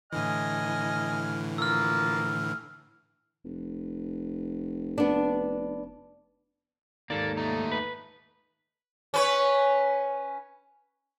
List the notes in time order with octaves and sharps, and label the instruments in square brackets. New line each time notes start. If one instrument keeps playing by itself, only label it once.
[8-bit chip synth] A2 D3 E3 [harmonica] D#5 G#5 F6
[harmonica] F3 A#3 [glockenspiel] E6 F6
[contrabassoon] F1
[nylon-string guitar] B3 D4
[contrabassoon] D#2 [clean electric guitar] G#2 A4 D5 [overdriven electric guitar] A#3
[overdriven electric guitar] A3 D#4
[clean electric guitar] B4
[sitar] C#4 B4 C#5